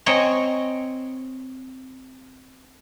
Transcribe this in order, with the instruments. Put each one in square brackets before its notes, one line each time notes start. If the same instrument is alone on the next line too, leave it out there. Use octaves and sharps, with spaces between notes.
[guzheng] C4 C#5 D#5 G#5 A#5